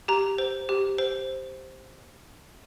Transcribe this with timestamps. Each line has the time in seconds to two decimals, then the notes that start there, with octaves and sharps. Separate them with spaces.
0.08 G4 A#5
0.38 C5
0.69 G4
0.98 C5